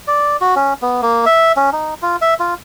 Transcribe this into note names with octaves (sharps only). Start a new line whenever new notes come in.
D5
F#4
C#4
B3
A#3
E5
C#4
D#4
F4
E5
F4